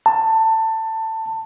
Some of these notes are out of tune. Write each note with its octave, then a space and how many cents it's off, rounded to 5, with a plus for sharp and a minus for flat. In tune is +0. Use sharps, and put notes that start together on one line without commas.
A5 +20